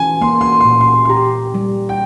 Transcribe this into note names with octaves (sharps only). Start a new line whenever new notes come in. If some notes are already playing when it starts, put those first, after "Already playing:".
Already playing: E3 C#4 G#5
A#3 C6
C6
A#2 C6
C6
C6
G4 A#5
G3
G5